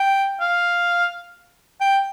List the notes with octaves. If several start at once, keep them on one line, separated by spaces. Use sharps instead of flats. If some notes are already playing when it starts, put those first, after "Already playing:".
Already playing: G5
F5
G5